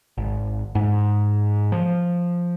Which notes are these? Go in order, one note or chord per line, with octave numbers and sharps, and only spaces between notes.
G#1
G#2
F3